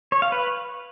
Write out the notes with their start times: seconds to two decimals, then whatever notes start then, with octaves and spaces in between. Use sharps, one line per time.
0.12 C#5
0.22 F5
0.32 B4